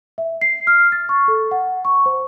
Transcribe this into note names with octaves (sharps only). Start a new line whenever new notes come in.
E5
C7
F6
A6
C#6
A4
F#5
C#6
C5